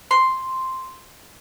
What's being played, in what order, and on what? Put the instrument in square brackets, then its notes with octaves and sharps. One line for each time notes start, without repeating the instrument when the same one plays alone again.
[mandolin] C6